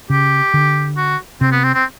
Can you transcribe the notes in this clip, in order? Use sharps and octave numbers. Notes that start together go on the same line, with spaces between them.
C#3 G4
D3
F#4
C3 C4
B3
C4
C4